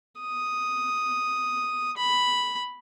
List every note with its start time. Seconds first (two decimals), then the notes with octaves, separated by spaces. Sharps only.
0.21 D#6
1.97 B5